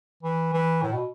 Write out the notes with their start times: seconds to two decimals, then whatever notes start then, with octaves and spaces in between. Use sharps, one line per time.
0.23 E3
0.53 E3
0.83 A2
0.93 B2